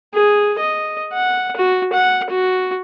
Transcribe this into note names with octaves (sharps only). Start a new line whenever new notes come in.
G#4
D#5
F#5
F#4
F#5
F#4